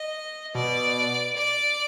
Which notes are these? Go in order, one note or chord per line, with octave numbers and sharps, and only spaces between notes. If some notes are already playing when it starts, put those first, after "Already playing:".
Already playing: D#5
B2 D5
D5